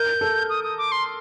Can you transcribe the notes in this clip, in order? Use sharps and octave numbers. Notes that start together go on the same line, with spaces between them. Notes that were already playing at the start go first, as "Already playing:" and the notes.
Already playing: A#4 G6
A4
D#6
D#6
D6
C6